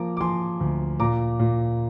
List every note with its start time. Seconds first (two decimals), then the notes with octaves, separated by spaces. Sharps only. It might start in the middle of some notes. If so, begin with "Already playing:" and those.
Already playing: F3 A#3 A#5 D6
0.17 D6
0.21 F3 G#5 C6
0.60 D2
1.00 A#2 A#5 D6
1.40 A#2